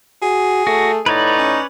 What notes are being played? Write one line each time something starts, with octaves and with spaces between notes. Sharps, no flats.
F#4 G#4
A3 F#4
A2 D#4 B4 C#5 D5
C#4